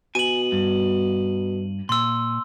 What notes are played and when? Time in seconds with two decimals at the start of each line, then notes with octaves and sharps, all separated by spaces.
0.15 B2 G#5 D#7 F#7
0.52 G2
1.89 A#2 C6 E6